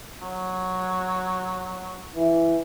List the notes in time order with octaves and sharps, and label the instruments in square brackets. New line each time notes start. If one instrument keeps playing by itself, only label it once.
[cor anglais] F#3
[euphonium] E3